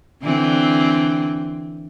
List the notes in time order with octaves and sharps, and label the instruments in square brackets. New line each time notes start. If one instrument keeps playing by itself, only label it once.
[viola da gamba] D3 E3 C4